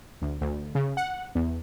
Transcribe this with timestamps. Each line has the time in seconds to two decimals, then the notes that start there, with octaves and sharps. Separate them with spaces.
0.22 D2
0.41 D2
0.75 C#3
0.97 F#5
1.35 E2